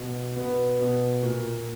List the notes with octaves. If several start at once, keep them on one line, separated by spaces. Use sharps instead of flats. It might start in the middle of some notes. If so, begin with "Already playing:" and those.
Already playing: B2
B2 B3
B2
A#2